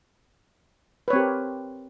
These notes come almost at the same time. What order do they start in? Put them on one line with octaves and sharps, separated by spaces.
B4 C#5 C4 G4 A#4